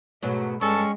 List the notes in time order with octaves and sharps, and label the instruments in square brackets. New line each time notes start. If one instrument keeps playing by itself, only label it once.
[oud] G#2 B2 F#3 [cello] A3
[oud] G2 [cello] G#3 [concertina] C#4 C#6 [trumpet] A4